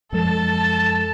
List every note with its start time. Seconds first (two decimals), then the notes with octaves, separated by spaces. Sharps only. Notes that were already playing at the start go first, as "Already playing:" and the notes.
0.12 F#2 F3 G#3 A4 A5